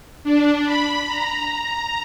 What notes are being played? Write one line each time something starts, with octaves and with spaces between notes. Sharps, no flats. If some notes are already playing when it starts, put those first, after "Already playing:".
D4
B5
A#5
A#5